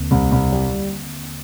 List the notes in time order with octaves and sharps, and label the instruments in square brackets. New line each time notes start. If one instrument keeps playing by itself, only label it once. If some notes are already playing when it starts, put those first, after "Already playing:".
Already playing: [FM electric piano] D#2 D3 A#3 C4
[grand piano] C2
C2
G3